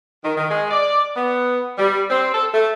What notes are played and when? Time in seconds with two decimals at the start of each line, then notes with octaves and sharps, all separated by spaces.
0.23 D#3
0.37 D#3
0.50 G#3
0.71 D5
1.15 B3
1.78 G3
2.09 C4
2.33 A4
2.52 A3